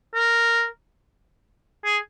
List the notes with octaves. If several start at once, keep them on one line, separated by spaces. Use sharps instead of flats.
A#4
G#4